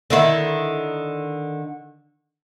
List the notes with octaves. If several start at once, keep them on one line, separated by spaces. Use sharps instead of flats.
D3 D#3 E4